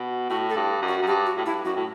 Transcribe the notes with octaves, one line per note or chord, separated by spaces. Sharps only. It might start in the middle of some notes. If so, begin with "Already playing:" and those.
Already playing: B2
A2 F#4
A4
G2
F#2
F#4
F#2
G2 G4
F#4
A2
G2 E4
F#2 F#4
A2